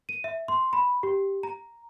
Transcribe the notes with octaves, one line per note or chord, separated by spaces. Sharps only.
D#7
E5
C6
B5
G4
A#5